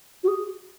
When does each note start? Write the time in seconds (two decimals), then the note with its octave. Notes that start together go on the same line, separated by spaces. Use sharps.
0.23 F#4
0.28 G#4